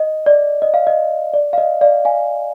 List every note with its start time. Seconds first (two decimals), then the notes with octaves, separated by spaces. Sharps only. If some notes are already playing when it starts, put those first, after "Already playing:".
Already playing: D#5
0.26 D5
0.62 D#5
0.74 F5
0.87 D#5
1.34 D5
1.53 F5
1.58 D#5
1.81 D5 F5
2.05 F5 G#5